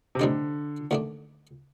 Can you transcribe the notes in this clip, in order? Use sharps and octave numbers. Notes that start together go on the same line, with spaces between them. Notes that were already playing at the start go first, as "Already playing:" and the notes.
C3
A2 D3 G3 C4 D#4 G4
D#2 D3 A3 D4